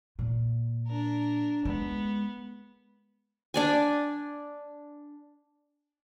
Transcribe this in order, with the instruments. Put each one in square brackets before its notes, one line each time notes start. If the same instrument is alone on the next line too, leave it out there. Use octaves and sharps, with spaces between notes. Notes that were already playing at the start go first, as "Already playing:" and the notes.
[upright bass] A#2
[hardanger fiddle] D4 A#4
[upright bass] G#3 [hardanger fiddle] B3
[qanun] D4 D5 G#5